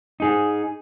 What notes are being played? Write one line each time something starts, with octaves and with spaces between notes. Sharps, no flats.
D#4 G#4